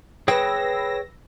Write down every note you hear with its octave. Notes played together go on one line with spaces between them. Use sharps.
G#4 B4 C#5 G5 E6 A#6